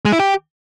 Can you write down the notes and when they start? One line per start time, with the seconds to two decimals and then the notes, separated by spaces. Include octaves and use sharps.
0.05 G#3
0.12 E4
0.20 G4